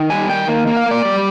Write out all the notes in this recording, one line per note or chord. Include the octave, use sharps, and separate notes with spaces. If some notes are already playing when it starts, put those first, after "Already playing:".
Already playing: D#3
G3 G#5
D#3 G5
A#3
A#3
F5
A#3 D5
G3